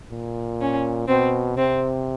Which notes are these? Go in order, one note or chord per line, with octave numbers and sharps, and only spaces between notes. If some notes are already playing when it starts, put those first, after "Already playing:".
A#2
C#4
B2 C4
C3 C4